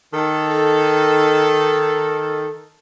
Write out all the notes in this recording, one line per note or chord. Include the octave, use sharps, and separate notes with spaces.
D#3 A4